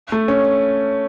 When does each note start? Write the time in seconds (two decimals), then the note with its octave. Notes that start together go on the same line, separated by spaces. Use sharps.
0.12 A3
0.28 C#4